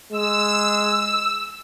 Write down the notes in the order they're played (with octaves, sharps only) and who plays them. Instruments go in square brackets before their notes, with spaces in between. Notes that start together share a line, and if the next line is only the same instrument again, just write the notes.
[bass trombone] G#3 [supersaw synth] E6